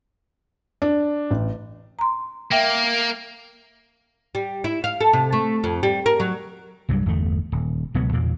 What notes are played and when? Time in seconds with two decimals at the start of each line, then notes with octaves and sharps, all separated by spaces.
0.82 D4
1.31 A1
1.99 A#5 C6
2.52 A#3 E5 G5
4.35 G3
4.64 E4
4.84 F5
5.01 A4
5.13 C3
5.33 A3
5.64 F2
5.83 G3
6.06 A#4
6.20 F#3
6.89 C2 G2 F#3 G3
7.06 G1 E2 A3
7.52 D#1
7.94 C#2 B2 F#3 B3
8.13 E2 A#2 A#3